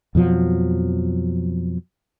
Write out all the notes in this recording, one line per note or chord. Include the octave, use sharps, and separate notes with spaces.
F2 B2 F3 F#3